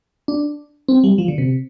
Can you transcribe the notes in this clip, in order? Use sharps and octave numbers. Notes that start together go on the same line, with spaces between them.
D4
C4
G3
F3
D3
C3